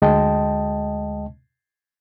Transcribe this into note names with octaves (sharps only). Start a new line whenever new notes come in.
D2 G#3 D#5 G5 A5